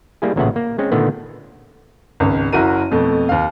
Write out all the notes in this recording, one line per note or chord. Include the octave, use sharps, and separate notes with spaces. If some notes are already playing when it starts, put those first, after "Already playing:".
G3 A#3 E4 G#4
A1 A#2 C#3 B3 E5 F#5
A#3
G#3 C4 C#4
A#2 D3 D#3 A3 B3
G#1 C#2
F#1 E4 F#4 A#4 D#7
F2 B2 A3
D#2 F5